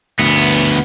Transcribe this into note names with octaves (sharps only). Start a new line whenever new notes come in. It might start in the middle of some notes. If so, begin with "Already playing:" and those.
D2 B3